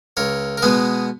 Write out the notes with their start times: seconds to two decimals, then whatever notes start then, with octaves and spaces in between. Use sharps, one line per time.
0.17 C#2 A#4 C#5
0.58 A#4
0.62 B2 G#3 B3 G#4 B4